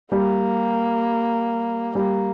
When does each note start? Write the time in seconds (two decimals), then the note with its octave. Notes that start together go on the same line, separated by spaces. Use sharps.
0.12 G3 A#3
1.95 G3 A#3